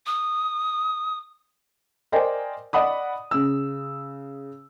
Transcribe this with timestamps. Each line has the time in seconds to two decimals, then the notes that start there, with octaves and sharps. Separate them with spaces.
0.06 D#6
2.12 A#4 C5 D5 D#5 G5 G#5
2.73 D5 D#5 F#5 B5 D#6
3.31 C#3 E6